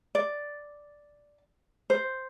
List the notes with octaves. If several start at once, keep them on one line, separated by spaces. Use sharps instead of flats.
D5
C5